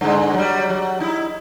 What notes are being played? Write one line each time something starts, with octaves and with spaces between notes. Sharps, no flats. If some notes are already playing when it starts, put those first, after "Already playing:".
G2 D3 G#3
F#3 G3
F#3
D#4 E4